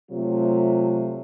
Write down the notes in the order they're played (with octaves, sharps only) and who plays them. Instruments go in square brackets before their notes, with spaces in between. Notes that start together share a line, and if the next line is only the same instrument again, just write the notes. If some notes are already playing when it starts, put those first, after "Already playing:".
[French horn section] C3 F#3 A3 F4